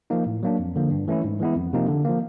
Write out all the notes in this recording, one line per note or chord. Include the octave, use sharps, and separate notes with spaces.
F3 A#3 D#4
A2
F#3 A#3 D4
F2
D3 F3 A#3
G2
E3 A3 C#4 E4
G#2
E3 G#3 B3 E4
F2
C3 F3 A#3 D#4
D3
F3 A#3